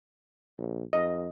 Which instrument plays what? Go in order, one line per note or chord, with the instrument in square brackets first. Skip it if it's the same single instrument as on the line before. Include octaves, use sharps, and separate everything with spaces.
[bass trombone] A#1
[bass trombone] F2 [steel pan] D#5